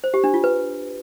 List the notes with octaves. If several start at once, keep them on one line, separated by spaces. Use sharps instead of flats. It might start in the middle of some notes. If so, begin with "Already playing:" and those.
C5
G4
D4
F4
B4